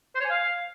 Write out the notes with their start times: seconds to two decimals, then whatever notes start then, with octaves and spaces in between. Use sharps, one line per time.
0.15 C5
0.20 C#5
0.25 G#5
0.30 F5